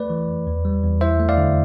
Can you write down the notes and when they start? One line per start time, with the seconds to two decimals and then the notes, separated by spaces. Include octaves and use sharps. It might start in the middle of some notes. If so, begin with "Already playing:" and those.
Already playing: A3 B4 D5
0.10 E3
0.27 F2
0.47 E2
0.65 G3
0.83 E2
1.01 E4 C5 E5
1.20 A3
1.29 D5 F5
1.38 D3